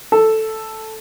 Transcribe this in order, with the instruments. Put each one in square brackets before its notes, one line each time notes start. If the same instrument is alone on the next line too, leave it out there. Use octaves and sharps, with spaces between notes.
[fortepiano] A4